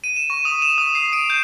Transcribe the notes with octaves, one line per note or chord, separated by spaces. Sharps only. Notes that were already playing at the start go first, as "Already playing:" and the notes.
D#7
E7
C#6
D#6
E7
D#6
C7
D7
G6